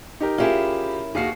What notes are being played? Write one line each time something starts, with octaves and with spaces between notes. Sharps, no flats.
D#4 G4 A#4
C#4 E4 F4 G4 G#4 A#4
D#2 F#4 G#4 F5 C7